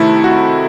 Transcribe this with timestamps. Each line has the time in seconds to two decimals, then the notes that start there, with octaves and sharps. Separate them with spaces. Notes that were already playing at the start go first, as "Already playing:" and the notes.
Already playing: C3 D#3 A3 E4 A4
0.24 F#4